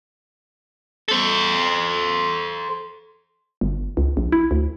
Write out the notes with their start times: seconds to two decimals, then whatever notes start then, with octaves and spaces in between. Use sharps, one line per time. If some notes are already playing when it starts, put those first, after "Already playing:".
1.08 A4 C5
3.61 G1
3.97 C#2
4.17 A#1
4.32 E4
4.51 D2